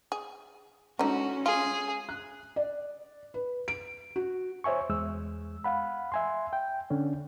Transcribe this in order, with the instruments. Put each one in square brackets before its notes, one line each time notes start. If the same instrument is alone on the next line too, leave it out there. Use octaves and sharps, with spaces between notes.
[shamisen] G#4
[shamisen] D3 D#4 [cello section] G#3 C#4 [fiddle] F#4
[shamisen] F4 [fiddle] G#4
[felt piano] F#6
D5
B4
D7
F#4
[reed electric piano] C5 C#5 E5 G#5 C#6
E2 G#3 E6
F5 F#5 B5
E5 G#5 C6
G5
D3 C#4 D4